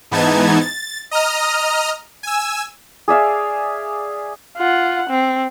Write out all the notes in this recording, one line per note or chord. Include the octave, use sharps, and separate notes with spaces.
G#2 E3 B3 D#4 A5 G#6
A6
D#5 A#5 D#6 F6
G#5 E6
G#4 D5 E5 F5
F4 F#5
C4